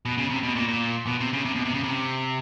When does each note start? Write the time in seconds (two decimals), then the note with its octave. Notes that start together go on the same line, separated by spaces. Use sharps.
0.05 B2
0.18 C#3
0.30 C3
0.43 B2
0.56 A#2
0.68 A#2
1.07 B2
1.20 C3
1.33 C#3
1.45 C3
1.55 B2
1.65 C3
1.74 C#3
1.84 C3